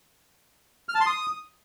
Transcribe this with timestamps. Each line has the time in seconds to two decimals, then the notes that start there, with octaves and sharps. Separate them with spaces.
0.89 F6
0.95 A5
1.00 C6
1.06 D#6